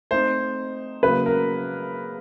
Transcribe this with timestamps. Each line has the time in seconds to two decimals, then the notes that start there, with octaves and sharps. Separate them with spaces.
0.11 A3 C4 D#4 C5
1.03 C#3 F#3 A#3 B4
1.26 A#4